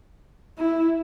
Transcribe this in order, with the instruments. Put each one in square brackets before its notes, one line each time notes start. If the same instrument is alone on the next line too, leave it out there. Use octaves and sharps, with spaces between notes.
[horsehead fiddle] E4